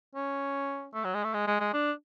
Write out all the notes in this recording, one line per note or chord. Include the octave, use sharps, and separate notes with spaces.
C#4
A3
F#3
G#3
A3
G#3
G#3
G#3
D4